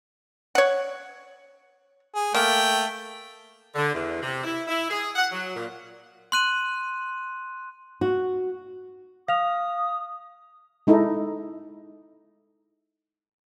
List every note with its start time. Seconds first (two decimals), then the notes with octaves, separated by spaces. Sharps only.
0.55 C#5 F#5
2.15 G#4
2.35 A3 A#3 G5
3.75 D3
3.94 E2
4.22 C3
4.44 E4
4.68 E4
4.89 G#4
5.16 F#5
5.32 F#3
5.56 A#2
6.32 C6 F#6 D#7
8.01 F#4
9.28 F5 D#6 F6 F7
10.87 G#3 D#4 E4 A4